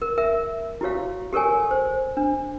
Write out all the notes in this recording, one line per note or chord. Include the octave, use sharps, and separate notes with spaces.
A#4
A#4 E5
E4 F#4 G4 C#5 F5
G4 A4 A#4 C#5 G#5
C5
D4